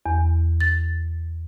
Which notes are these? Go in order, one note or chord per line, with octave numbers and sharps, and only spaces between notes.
E2
A6